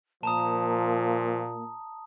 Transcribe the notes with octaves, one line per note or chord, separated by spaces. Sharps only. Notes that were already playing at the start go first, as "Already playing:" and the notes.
A#2 F3 A#3 A5 A#5 D#6